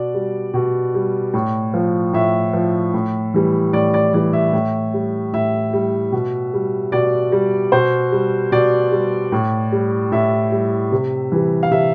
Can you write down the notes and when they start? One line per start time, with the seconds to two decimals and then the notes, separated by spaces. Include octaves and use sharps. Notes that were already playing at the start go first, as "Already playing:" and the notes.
Already playing: B2 D5
0.14 G3
0.54 B2
0.95 G3
1.34 A2
1.74 F3
2.13 A2 E5
2.53 F3
2.94 A2
3.34 E3 G3
3.73 A2 D5
3.94 D5
4.14 E3 G3 D5
4.33 E5
4.53 A2
4.94 G3
5.33 A2 E5
5.73 G3
6.12 B2
6.53 G3
6.92 B2 D5
7.32 G3
7.72 B2 C5
8.12 G3
8.52 B2 D5
8.92 G3
9.32 A2
9.72 G3
10.12 A2 E5
10.52 G3
10.92 C3
11.32 E3 G3
11.63 F5
11.71 C3 E5